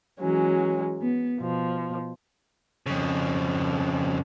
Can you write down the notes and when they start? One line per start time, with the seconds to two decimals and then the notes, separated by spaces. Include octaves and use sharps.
0.20 E3 F#3 G#3 C#4
1.01 B3
1.40 B2 F3
2.86 F2 C#3